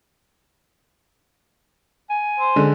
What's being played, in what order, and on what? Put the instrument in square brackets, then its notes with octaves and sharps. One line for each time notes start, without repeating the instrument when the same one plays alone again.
[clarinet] G#5
[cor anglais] C5
[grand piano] D3 G#3